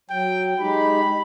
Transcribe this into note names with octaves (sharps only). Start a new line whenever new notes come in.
F#3 G5
G#3 D#4 G4 B5